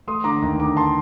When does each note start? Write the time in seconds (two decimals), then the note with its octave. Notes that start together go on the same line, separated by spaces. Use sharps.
0.07 A3 C6 D#6
0.24 D3 A#5 D6
0.42 D#2
0.59 D3 A#5 D6
0.77 A5 C6